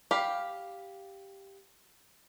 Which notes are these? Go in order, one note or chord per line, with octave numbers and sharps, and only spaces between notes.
G4 F5 G5 B5